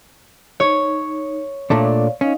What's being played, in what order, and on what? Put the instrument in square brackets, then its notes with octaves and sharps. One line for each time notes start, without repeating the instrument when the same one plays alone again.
[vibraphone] D#4 [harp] C#5
[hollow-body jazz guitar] A#2 A3 D4 [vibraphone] C#5 D5 F5
[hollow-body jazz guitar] C#4 [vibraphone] D#4 D#5 F5